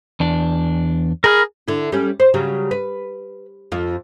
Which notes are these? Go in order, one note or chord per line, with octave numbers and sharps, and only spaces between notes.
E2 D4
G#4 A#4 B5 F6
D3 E4
G3 C#4
C5
C#3 F#3 G3
B4
F2 F4